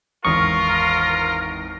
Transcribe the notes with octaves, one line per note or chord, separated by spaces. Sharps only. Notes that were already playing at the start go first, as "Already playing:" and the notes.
G#1 E2 F4 A#4 C#6 D#6